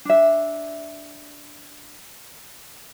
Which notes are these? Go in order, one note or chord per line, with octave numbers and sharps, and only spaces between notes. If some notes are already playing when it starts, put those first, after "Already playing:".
D4 E5